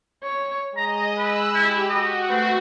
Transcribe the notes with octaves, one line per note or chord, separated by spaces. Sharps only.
C#5
G#3 D#5 A#5
B4 B5 E6 F#6
E4 G4
F#4 D#5
A3 C4 B4